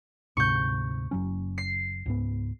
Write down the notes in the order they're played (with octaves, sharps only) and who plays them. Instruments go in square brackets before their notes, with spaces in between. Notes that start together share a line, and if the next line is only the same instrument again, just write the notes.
[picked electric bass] D2 G#2 C3 [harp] C#6 G6
[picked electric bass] F#1 F#3 C#4
[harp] C7
[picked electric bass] C#2 G#2 B3